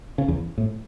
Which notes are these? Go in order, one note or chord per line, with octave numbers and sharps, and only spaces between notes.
C#3
E2
A2